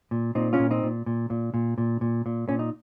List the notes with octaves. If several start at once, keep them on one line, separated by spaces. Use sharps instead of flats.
A#2
A#2 C4 D#4
C#4 F4
A#2
C4 D#4
A#2
A#2
A#2
A#2
A#2
A#2
A#2
A#2 C#4
D#4